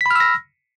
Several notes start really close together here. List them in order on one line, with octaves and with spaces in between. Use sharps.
B6 B5 F6 E6 A#6